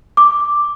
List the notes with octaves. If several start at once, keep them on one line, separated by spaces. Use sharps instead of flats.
D6